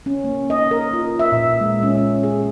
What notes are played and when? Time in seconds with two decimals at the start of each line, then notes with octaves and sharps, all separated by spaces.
0.06 C#4
0.24 A#3
0.50 D#5
0.71 A#4
0.93 F4
1.19 E5
1.32 A#2
1.61 G#3
1.83 C#4
1.97 C#4
2.23 G#4